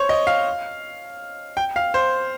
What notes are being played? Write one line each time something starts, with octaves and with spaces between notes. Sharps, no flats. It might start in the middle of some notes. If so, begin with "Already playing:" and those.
Already playing: C5 C#5
D#5
F5
G5
F5
C5